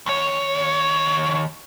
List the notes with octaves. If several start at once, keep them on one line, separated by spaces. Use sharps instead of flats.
D#2 C#5